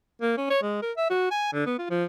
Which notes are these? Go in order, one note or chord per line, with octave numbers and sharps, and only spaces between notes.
A#3
C#4
C#5
G#3
A#4
E5
F#4
G#5
D3
B3
F4
F3